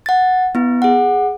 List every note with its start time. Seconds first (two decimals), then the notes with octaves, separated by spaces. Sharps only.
0.06 F#5 A6
0.55 B3 E4
0.82 G#4 F#5